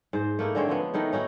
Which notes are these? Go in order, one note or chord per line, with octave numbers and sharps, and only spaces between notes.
G#2 C5
A3 A#3 D#4 E4
D3 G#3 C4 C#5
F3 G#3 B3
D#3 A3 D#4 E4
C#4 D#4 E4 F#4